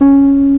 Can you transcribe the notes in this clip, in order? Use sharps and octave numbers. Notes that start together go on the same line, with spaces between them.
C#4